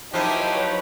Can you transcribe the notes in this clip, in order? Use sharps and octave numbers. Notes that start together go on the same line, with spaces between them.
F3 F#3 D#4 E4 G4 B4 C#5 A5